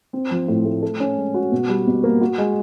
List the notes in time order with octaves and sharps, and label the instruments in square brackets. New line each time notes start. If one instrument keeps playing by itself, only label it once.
[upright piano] C4
F3
A2
A3
A4
C#4
G#3
F#4
B2
G3
B2
A#3
F#4
G#3